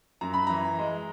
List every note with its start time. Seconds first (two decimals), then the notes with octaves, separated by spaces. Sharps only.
0.21 F#2 A#5
0.34 B5
0.47 E3 A#5
0.79 G#3